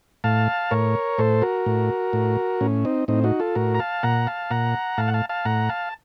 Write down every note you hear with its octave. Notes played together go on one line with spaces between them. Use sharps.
A2 F5 A5
A2 A#4 C#5
A2 A4 C5
F#4 A#4
A2
A2
A2 C#4
C4 D#4
A2 C4 D#4
D#4 F#4
F4 A4
A2 F#4 A#4
A#5
F5 A5
A#2 F#5 A#5
F5 A5
A#2 F#5 A#5
A2 F5 A5
F#5
F5 A5
F5 A5
A2 F#5 A#5
F5 A5